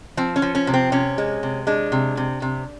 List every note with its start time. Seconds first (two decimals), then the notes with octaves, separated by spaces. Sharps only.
0.17 F3 C4
0.36 C#4
0.42 F3
0.55 C#4
0.67 C3
0.74 C4
0.92 C3 C#4
1.18 G#3
1.43 C3
1.67 G#3 D4
1.92 C3
2.17 C3
2.42 C3